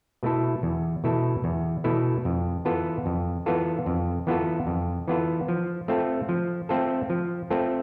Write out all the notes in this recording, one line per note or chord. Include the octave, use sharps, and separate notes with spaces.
B2 A3 E4 A4
E2
B2 A3 E4 A4
E2
B2 A3 E4 A4
F2
E3 B3 F4 A4
F2
E3 B3 F4 A4
F2
E3 B3 F4 A4
F2
E3 B3 F4 A4
F3
A3 C4 F4 A4
F3
A3 C4 F4 A4
F3
A3 C4 F4 A4